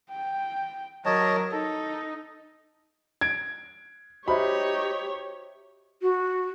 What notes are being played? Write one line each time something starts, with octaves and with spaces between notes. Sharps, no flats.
G5
F#3 A#4 C#5 D#5 A5
D#4 A4
G#6 D7
D#4 F#4 G4 C5 C#5 E5 B5
F#4